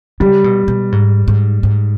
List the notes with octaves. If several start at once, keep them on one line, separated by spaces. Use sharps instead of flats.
C#3 G3
B2
B2
G#2
G#2
G#2